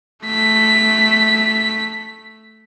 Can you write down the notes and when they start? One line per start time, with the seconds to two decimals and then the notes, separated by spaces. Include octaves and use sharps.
0.25 A3 B6